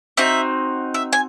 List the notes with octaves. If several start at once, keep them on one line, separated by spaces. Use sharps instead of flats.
C4 D#4 F#4 E5
E5
G#5